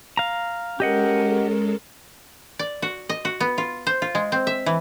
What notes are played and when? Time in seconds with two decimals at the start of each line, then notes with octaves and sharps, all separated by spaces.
0.17 F5 A#5
0.80 G#3 C#4 G4 A4 A#4 D#5 F#5
2.59 D5
2.82 F#4
3.09 D#5
3.25 F#4
3.40 B3
3.58 F4
3.87 C5
4.02 F4
4.15 G#3
4.32 C4
4.47 E5
4.66 E3